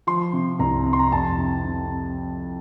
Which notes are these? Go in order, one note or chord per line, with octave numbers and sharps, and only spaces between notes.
F3 C6
C3
C2 A#5
C3 A#5
C6
A#5
F2 A5
C3
C3